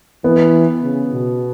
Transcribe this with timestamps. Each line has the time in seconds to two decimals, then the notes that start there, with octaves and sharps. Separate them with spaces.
0.24 E3 B3
0.83 C#3
1.12 B2